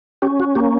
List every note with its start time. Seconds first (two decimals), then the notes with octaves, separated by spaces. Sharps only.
0.22 C#4 G4
0.40 F#4
0.55 A#3 G4